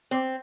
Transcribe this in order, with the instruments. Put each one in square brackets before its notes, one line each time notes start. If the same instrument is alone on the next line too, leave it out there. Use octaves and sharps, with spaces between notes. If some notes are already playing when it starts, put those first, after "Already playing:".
[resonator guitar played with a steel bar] C4